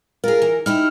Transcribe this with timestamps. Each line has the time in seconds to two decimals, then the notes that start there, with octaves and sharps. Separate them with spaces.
0.24 F4 G#4 A#4
0.42 E3
0.66 D#4 E4 G4 F6